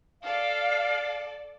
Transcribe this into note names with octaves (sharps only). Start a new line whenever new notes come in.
A4 D5 F5